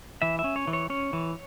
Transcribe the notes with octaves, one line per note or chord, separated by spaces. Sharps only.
E3 E5
E5
C#4
C#5
E3
C#5
C#4 C#5
E3